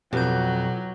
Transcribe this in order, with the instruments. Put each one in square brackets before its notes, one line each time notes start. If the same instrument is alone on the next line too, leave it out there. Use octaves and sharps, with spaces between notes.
[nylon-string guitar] F2 [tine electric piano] B2 [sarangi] F#3 [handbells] G4 B4 G6